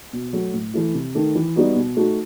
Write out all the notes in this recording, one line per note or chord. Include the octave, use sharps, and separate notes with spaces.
B2
F#3 A3
A2
E3 A3 E4
C3
D#3 A3 D#4
E3
G3 B3 D#4 F#4
B2
A3 D#4 F#4